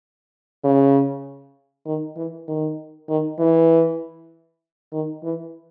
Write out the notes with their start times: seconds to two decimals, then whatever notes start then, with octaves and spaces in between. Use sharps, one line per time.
0.64 C#3
1.86 D#3
2.16 E3
2.48 D#3
3.09 D#3
3.39 E3
4.93 D#3
5.24 E3